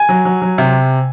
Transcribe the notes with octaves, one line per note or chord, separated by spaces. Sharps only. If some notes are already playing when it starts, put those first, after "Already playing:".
Already playing: G#5
F#3
F#3
F#3
C3